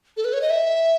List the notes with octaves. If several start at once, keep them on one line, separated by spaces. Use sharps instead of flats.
A4
B4
C#5
D#5
E5